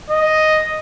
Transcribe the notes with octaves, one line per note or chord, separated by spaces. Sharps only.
D#5